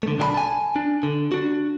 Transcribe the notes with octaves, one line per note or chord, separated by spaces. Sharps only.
D3 A3
B1 D3 D4 G#4 A5 B5
G#5 A5
D4
D3
D4 F#4